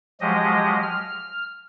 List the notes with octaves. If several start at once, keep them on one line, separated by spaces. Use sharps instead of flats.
F3 F#3 G#3 G4 D#5
F6